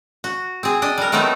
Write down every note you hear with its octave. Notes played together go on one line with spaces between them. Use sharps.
F#4
C4 G#4
D4 D#5
G3 A#4
D#3 F#3 A3 B3 C4 D#4